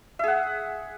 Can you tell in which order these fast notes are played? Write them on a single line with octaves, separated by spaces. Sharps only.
E5 G#4 F#5